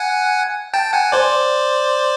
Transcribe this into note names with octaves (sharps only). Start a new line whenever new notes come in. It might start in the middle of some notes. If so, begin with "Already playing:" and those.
Already playing: F#5 G#5
G5 A5
F#5 G#5
C5 D5